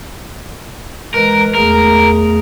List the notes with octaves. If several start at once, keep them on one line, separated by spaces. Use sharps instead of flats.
E3 G#3 A#4 B4
E2 A3 G#4 A#4